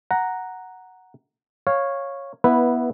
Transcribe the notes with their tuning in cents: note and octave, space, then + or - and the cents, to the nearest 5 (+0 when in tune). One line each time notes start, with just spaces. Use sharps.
F#5 +0 A#5 +0
C#5 -10 F5 +0
B3 -15 E4 -5 B4 +0